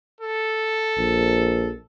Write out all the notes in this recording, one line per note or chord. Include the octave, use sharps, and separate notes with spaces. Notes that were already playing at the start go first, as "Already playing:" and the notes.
A4
A#1